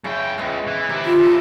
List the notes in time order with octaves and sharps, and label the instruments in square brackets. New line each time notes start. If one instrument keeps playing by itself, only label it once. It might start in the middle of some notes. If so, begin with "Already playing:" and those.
[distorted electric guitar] F#2 G5 [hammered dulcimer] C#3 E4
[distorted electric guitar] C#2 [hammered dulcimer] G#3 B3
[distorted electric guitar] E3
[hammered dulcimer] C3 D6 [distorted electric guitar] D#3 E4
[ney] F4
[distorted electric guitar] E2 A4